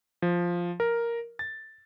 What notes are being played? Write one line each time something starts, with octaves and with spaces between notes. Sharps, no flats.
F3
A#4
A6